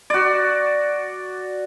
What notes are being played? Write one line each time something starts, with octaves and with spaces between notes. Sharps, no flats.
F#4 D5